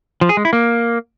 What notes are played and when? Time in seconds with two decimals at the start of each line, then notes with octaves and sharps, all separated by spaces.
0.21 F3
0.29 G#4
0.37 G#3
0.45 E4
0.53 A#3